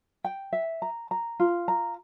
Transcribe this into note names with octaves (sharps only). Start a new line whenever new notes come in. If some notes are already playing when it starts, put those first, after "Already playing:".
G5
E5
A#5
A#5
F4
A#5